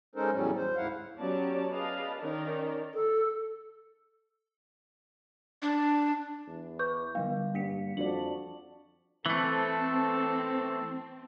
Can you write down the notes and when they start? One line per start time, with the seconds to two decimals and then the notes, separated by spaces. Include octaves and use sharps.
0.15 G#3 C#4 D#4 A4 A#4 C5
0.32 E2 A2 F#3 G3 C#4
0.56 C5
0.76 D2 G#2 E4 F5 F#5
1.19 F#3 B3 C#4 G4 D5 A5
1.70 G#4 B4 D5 D#5 F5 A5
2.21 D#3 C#4 D#4 A#4 D5
2.94 A4
5.62 D4
6.47 E2
6.79 B4 C#6 D6 G6
7.15 D3 G3 B3 F5
7.55 G2 A#3 B6 C#7
7.97 F2 D4 F#4 D5 F#7
9.26 E3 A3 C4 A4